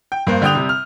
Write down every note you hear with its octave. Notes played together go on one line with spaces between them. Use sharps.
G5
G2 A#3 C5
D3 G3 G5 D#6 G6 F7
C3 G3
F6